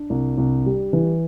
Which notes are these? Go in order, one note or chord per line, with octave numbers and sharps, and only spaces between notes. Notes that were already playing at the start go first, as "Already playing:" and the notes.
Already playing: D4
C2
C2
G3
E3